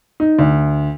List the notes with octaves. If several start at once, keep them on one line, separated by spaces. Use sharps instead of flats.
D#4
D2